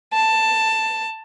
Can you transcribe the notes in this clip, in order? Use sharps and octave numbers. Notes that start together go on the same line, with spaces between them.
A5